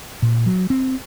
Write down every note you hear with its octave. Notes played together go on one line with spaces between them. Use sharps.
A#2
F#3
C4